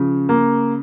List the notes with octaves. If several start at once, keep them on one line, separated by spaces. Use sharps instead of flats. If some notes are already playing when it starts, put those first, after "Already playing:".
Already playing: C#3 F3
A#3